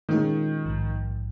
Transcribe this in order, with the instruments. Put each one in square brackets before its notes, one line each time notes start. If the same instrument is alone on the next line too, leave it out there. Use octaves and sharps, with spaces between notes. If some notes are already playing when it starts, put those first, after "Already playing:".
[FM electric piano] A#2 G#3 C#4 F4 G#4 [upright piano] D#3
[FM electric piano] A#1 G#2 F3